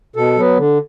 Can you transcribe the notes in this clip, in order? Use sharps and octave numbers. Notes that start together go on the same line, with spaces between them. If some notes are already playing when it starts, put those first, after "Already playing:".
B2 A4
F#3 B3
D3